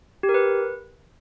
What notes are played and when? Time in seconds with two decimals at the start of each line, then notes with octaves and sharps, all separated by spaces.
0.23 G4
0.29 A#4
0.34 B4